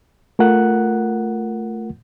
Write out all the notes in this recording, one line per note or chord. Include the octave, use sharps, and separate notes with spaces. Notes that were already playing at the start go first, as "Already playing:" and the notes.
A3 F4 A#4 F#5 F#6